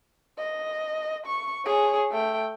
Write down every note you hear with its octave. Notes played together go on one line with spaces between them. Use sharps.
D#5
C#6
G#4 C#5
A3 G5